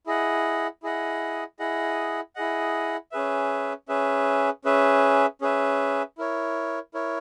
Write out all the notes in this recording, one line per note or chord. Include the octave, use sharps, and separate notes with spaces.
E4 G#4 D#5 F#5
E4 G#4 D#5 F#5
E4 G#4 D#5 F#5
E4 G#4 D#5 F#5
C#4 G#4 B4 E5
C#4 G#4 B4 E5
C#4 G#4 B4 E5
C#4 G#4 B4 E5
E4 A#4 C#5
E4 A#4 C#5